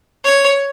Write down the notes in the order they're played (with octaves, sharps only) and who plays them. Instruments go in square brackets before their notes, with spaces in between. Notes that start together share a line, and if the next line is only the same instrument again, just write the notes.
[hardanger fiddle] C#5